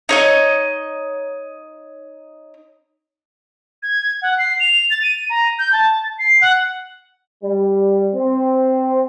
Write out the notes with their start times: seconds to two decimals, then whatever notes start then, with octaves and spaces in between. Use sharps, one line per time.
0.09 D#4 C#5 D#5
3.83 G#6
4.22 F#5
4.38 C7
4.60 F7
4.91 A6
5.03 D#7
5.30 A#5
5.59 G6
5.73 A5
6.18 C7
6.41 F#5
7.42 G3
8.14 C4